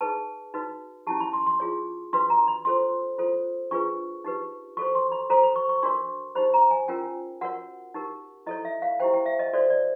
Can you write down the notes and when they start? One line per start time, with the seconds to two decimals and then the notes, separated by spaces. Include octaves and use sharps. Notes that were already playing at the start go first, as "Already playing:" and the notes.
0.01 D#4 G#4 B4 A5
0.54 D#4 F#4 B4
1.07 C#4 E4 G4 A5
1.20 B5
1.33 C6
1.46 C6
1.60 F4 G#4 C#5
2.13 D4 F#4 B4 C6
2.30 A#5
2.48 B5
2.65 F4 A4 C5 C6
3.18 F4 A4 C5
3.71 D4 F4 G#4 B4 C#6
4.24 D#4 G4 B4
4.77 F#4 A4 C5 C#6
4.95 C6
5.12 B5
5.30 F#4 A4 C5 A#5
5.43 B5
5.56 C#6
5.69 C#6
5.83 D4 F#4 A#4 C#5 C6
6.35 D#4 G4 C5 B5
6.54 A#5
6.71 G#5
6.88 C#4 F4 A#4 G5
7.41 F#4 A#4 C#5 F#5
7.94 D#4 G4 A#4
8.46 E4 A4 C#5 D#5
8.65 E5
8.82 F5
9.00 E4 G4 C5 G5
9.13 G5
9.26 E5
9.39 D#5
9.53 F#4 A4 C5 D5
9.70 D5